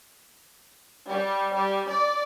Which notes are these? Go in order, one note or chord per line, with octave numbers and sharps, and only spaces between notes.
G3
G3
D5